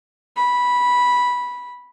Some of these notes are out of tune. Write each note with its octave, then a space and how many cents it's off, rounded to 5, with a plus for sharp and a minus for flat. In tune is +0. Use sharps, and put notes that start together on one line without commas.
B5 -10